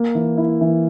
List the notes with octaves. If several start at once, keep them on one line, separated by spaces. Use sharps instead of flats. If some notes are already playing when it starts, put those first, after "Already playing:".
Already playing: A#3
E3
E4
E3